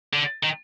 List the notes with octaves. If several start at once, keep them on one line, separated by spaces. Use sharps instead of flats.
D3
D#3